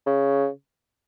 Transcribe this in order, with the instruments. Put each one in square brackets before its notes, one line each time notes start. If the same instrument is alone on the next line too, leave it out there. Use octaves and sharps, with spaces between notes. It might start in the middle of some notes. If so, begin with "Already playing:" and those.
[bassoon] C#3